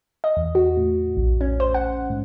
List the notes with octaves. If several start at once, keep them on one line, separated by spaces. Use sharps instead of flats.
D#5
E2
F#4
A2
A#1
C#4
C5
F#5
G#2